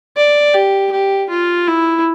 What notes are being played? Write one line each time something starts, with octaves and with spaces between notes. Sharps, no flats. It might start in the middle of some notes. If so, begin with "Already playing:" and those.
D5
G4
G4
F4
E4